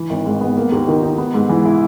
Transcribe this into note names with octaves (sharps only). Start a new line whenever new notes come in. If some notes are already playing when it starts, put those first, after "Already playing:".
Already playing: E3
G#1
G#2
B3
A#3
D#2
D#3
D#4
B3
G#2
E3
E4